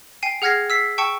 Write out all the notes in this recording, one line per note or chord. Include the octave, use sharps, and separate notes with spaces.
G5 G#5 C7 D#7
G#4 F#5 F6 G#6 A#6 C7
E6 B6 C7
G5 A5 C#6 E6 C#7